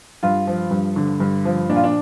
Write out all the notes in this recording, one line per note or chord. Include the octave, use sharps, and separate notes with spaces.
G2 F4
F3
G2
D3
G2
F3
A#2 D4
F4
D4